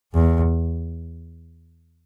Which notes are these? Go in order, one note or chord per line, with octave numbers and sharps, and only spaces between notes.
E2